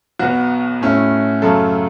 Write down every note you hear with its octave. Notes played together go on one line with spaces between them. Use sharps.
B1 B2 B3 F#4
A2 A3 C#4 E4
F#2 C#3 F#3 A3 A4